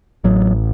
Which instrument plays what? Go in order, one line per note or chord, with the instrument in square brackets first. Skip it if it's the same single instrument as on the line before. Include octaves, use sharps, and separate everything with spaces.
[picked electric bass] A1 F#3